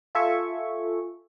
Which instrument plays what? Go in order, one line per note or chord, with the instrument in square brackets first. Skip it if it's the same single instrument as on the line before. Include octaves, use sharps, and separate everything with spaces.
[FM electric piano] F4 A4 E5 G#5 C#6